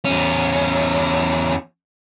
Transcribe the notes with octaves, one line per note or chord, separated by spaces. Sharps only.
E2 C#4